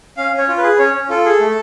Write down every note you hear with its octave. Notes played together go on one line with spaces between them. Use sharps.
C#4 F5
C#4
C#5
F4
B4
G#4
C#4 C#5
C#4
F4 A4
G#4
A3